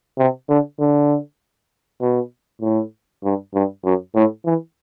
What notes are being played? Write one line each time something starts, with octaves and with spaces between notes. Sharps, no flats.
C3
D3
D3
B2
A2
G2
G2
F#2
A2
E3